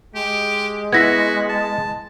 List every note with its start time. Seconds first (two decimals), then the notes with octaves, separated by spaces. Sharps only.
0.15 G#3 G4
0.93 B3 E4 F#4 G#6 A#6 B6
1.49 A5